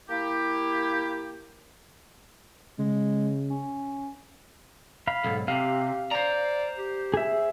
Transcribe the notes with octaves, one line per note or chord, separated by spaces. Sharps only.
A#3 E4 G4
C#3 G#3
C#4
F5 B5
B1 G#2 A4
C3 G4 F5
C5 D5 A#5
G4
G#4 E5